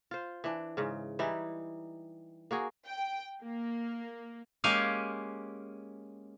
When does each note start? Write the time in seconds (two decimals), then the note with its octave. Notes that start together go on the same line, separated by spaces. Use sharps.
0.11 F4 C5
0.44 E3 D4
0.77 G#2 C#3
1.19 E3 G3 D#4 E4
2.51 A#3 F#4 G#4
2.85 G5
3.43 A#3
4.64 G#3 A#3 C#4 G4 F5 G#5